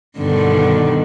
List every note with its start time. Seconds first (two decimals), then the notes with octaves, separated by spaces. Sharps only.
0.18 G2 B2 D3 D#3 B3